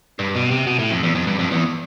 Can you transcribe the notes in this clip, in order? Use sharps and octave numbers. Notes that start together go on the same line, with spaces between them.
G2
B2
C3
B2
A2
F2
E2
F2
G2
F2
E2